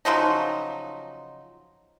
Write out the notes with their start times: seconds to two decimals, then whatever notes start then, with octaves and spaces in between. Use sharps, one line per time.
0.05 C#3 F3 F#3 D#4